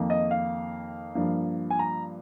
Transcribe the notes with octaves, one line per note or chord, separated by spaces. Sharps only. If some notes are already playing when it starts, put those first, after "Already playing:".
Already playing: F2 D#3 A#3
D#5
F5
G2 F3 A#3
G#5
A#5